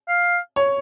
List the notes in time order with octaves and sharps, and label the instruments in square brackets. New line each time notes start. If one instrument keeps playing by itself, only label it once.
[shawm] F5
[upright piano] C#5